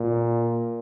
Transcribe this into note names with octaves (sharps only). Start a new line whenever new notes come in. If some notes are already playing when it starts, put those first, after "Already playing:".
Already playing: A#2